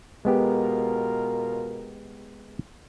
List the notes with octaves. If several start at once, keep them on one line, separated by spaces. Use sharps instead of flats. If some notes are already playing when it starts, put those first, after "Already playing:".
B2 G#3 B3 F4 G4 A#4